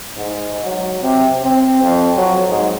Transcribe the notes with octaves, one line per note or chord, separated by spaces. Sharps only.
G#2
F#3
C3
C4
F2
F#3
G#2